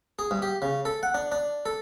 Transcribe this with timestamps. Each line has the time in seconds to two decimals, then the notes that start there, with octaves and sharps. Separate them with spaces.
0.19 G#4
0.31 G2
0.42 G4
0.62 C#3
0.85 A4
1.03 F#5
1.14 D4
1.32 D4
1.66 A4